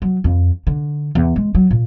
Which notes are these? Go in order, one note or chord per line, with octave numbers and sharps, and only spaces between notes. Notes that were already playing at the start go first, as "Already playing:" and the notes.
F#3
F2
D3
E2
G#3
F#3
A#2